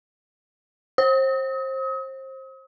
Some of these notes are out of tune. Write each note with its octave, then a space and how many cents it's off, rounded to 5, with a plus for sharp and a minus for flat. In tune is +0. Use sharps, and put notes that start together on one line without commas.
C5 +30 D#6 +40